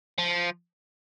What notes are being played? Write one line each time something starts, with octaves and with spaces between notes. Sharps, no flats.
F3